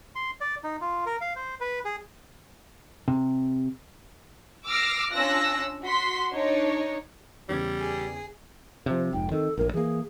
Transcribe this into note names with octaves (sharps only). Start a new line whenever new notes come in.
C6
D5
D#4
F4
A#4
F5
C5
B4
G#4
C3
D6 E6 F6 A#6 C7
C#4 D4 F4 E6 F#6 A#6
F#4 C6 B6
D4 D#4 C#5
E2 C#3 G3 G#6
G#4
C3 F3 C5
F1 G#2 G5
D#3 C4 A4
A#1 A2 A#4
E3 A#3 G#4